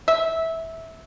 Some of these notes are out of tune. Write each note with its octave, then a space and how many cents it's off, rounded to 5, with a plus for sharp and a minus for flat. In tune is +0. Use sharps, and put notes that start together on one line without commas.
E5 -15